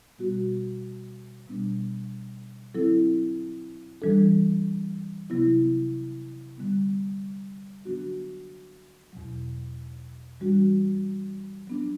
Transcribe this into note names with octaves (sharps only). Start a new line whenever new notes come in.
B2 G3 B3 F#4
B2 G3 B3 D4
D3 F#3 C4 E4 A4
E3 G3 D4 A4
C3 F#3 B3 E4
D3 G3 B3
D3 F#3 B3 D4 F#4
E2 B2 F#3
E3 G3 D4 F#4
F#3 B3 D4